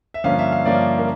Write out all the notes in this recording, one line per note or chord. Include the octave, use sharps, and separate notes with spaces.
E5
G2 D3 F3 A#3 C#4 F5
E5
F5
G2 D3 F3 A#3 C#4 D5
A#4